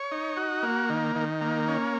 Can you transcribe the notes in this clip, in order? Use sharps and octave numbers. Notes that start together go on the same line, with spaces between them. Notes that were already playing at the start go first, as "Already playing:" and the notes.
Already playing: C#5
D#4
F#4
A#3
D#3
D#3
A#3
C#4